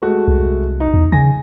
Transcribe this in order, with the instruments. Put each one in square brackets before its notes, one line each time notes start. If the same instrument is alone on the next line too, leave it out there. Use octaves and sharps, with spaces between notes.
[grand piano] G#3 A3 F#4
[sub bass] C2
[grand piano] D#4
[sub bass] E2
[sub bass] C#3 [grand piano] G#5 A#6